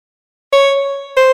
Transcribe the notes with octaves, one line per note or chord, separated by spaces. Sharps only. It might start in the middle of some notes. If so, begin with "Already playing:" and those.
C#5
C5